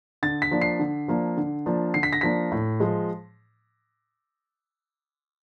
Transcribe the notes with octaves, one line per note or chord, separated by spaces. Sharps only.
D3 A6
B6
F3 A#3 D4
C7
D3
F3 A#3 D4
D3
F3 A#3 D4
D3 C7
B6
A#6
F3 A#3 D4 B6
A2
F3 G#3